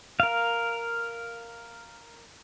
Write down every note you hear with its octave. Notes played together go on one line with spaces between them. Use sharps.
A#4 F5